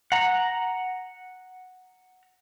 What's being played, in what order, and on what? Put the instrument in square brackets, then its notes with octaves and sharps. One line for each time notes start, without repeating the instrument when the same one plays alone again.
[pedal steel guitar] F#5 A#5